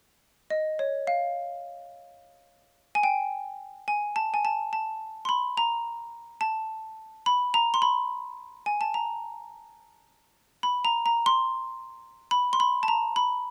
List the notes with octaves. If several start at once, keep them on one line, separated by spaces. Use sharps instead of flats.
D#5
C#5
F5
G#5
G5
G#5
A5
G#5
A5
A5
C6
B5
A#5
A5
B5
A#5
C6
B5
G#5
A5
A#5
B5
A#5
A#5
C6
B5
C6
B5
A5
A#5
B5